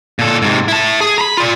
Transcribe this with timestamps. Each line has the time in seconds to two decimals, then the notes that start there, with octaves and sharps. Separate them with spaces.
0.19 A#2 A4
0.42 G#2 C3
0.68 E4 A5
1.01 G#4
1.18 A#5 B5
1.37 F4 D5